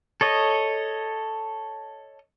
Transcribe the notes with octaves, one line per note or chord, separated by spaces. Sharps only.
A4 C#5 D#5